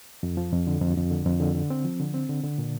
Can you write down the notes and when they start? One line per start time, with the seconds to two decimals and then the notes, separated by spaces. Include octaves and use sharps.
0.23 F2
0.37 F3
0.52 F2
0.67 D3
0.81 F2
0.97 F2
1.11 D3
1.26 F2
1.40 D3
1.55 D3
1.70 C4
1.85 F3
2.00 D3
2.14 C4
2.29 D3
2.44 D3
2.58 A#2